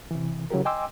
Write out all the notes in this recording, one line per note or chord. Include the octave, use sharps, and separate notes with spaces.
C3 E3
C#3 F#3 E4 G4 A#4
D#5 G5 G#5 C6 D6 E6